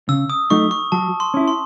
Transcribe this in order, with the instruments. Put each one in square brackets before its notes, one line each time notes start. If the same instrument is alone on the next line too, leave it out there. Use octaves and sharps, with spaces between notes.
[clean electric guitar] C#3 [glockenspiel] E6
[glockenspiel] D#6
[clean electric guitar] F#3 A3 D#4 [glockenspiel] C#6
[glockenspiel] C#6
[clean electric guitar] F#3 [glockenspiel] A5
[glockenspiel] C6
[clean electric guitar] C#4 E4
[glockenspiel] C6